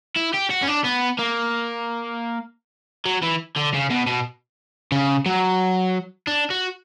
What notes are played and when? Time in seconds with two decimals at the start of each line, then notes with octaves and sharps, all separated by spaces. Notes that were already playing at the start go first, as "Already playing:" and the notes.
0.16 E4
0.34 G4
0.51 F#4
0.63 C#4
0.68 D4
0.85 B3
1.19 A#3
3.05 F#3
3.22 E3
3.56 D3
3.74 C#3
3.90 B2
4.07 B2
4.92 C#3
5.26 F#3
6.27 D4
6.50 F#4